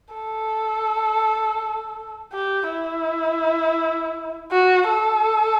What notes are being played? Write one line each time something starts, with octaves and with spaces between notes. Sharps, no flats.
A4
G4
E4
F#4
A4